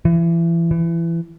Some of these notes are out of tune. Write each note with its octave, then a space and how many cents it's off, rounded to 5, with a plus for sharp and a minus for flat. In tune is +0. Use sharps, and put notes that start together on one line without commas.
E3 +30
E3 +25